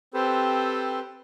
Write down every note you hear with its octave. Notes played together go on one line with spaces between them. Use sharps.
C4 G4 A4 B4 C5